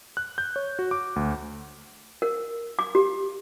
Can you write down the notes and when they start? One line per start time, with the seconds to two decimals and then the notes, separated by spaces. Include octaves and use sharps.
0.17 F#6
0.38 G6
0.56 C#5
0.79 F#4
0.91 D6
1.16 D2
2.22 A#4
2.79 D6
2.95 G4